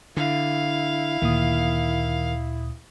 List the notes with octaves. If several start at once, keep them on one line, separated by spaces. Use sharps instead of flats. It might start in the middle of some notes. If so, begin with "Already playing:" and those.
D3 E4 F5
D2 A#2 D#3 D#6